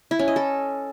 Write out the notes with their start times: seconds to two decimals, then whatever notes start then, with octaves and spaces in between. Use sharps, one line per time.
0.11 E4
0.19 C#4
0.28 D#5
0.36 A4